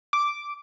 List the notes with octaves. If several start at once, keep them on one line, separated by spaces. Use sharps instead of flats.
D6